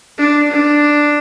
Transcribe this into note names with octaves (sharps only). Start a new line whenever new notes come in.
D4
D4